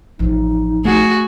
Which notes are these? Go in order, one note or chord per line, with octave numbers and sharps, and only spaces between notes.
A1 F3 D#4
A3 F#4 G#4